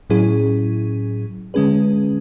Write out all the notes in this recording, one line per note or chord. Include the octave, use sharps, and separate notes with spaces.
A2 F#3 C#4 E4 G#4
D3 G#3 C#4 G#4 B4